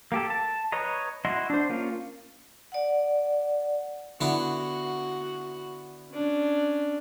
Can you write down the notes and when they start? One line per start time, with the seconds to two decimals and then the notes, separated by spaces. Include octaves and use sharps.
0.12 A#3 G4 A4
0.30 A5
0.72 B4 C#5 D#5 A#5
1.25 E4 F#4 D#5 C6
1.50 D4 C5
1.70 A#3 C#4 F4
2.72 D5 F#5
4.21 D3 B3 E4 F#4
6.11 C#4 D4